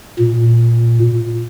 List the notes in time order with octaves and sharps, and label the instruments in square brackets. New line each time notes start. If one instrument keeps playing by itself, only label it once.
[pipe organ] A#2